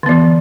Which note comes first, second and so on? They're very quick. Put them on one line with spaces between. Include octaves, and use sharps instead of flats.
D3 B3 E3